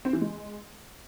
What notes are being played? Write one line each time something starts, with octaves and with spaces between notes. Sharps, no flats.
C4
E3
G#3